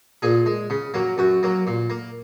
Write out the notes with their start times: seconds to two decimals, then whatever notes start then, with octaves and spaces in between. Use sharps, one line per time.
0.22 A#2 G#4
0.46 G#3
0.70 C#3
0.94 F#3 A#3
1.18 F#2 F#4
1.43 F#3 A#3
1.67 A#2
1.90 A#3